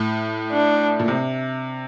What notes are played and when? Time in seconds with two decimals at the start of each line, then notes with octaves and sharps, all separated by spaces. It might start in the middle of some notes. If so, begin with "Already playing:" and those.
Already playing: A2
0.52 D4
1.00 A#2
1.08 C3